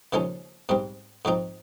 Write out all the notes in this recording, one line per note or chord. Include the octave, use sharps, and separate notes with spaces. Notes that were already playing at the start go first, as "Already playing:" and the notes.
D#2 C#3 F3 G#3 C#4
G#2 G3 C4
G#2 F3 C4 D#4